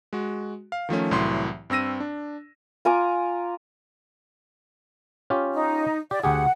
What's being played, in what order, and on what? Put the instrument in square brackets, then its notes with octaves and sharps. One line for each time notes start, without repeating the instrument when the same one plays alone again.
[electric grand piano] G#3 F#4
F5
D#3 F3 A3 C#4
C2 A2 E3 F#3 C6
G2 C4 E6 A#6 D#7
D4
[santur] F4 G#5 A#5 D6
[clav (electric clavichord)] C#4 F4 G4
[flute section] D#4
[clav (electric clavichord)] G4 [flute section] D5
[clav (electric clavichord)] D2 G4 G#4 [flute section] F#5